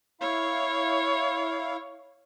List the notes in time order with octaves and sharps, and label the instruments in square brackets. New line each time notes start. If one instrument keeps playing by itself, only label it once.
[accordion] E4 F5 [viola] C#5